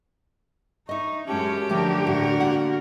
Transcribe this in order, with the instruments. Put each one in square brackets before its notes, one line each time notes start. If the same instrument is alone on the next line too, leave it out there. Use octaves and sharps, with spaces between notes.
[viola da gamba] D#4 [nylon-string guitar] D#5 E5 [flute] C#6
[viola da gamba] F#2 G#3 C#4 [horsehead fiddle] G4 [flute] A5
[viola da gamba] D3 A#4 [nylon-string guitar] F3 A3
[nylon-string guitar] D#2 A2 [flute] F#4
[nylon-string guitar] A#3 F#5